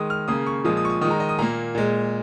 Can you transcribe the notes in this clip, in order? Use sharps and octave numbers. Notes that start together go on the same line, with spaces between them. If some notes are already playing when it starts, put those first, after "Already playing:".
Already playing: D#3 G#3 D#6
F6
C#3 A#3 D#6
C#6
A#2 F3 G#3 D#6
D#6
C#6
D#6
D#3 G#3 D#6
A#5
D#5
D#6
A#2 A#3 A#5
A#2 G#3